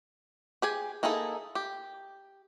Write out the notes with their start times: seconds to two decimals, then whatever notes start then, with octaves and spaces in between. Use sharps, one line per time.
0.62 G4 G#4 G#5
1.03 A#3 D#4 E4 G#4 A4
1.55 G4